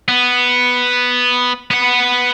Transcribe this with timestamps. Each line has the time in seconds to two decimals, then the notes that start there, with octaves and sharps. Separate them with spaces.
0.08 B3
1.70 B3 F#5